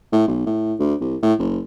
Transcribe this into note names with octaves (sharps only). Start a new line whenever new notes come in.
A2
B1
A2
D2
C2
A2
F#1